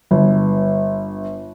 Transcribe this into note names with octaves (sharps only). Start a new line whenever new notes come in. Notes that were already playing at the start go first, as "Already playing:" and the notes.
G1